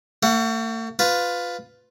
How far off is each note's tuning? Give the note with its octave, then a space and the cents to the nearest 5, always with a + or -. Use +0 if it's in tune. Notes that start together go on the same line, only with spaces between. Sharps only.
A3 +45 F#5 +0
F4 +10 B4 +15